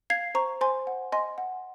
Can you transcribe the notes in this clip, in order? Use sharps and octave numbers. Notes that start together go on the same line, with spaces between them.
F5 G#6 C7
C5 A#5 C#6
C5 G#5 C6
F#5
D#5 G#5 C6
F#5